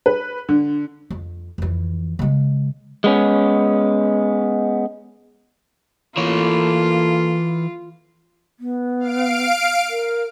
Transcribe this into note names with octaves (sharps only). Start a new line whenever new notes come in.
B4
D3
F2
F2 E3
C#3 G#3
G#3 B3 C#4
E3 A#3 F4 A4 C#5
B3
F5 D7
A#4